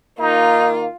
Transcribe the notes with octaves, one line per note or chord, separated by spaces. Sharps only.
D#3 A#3 D#4 F4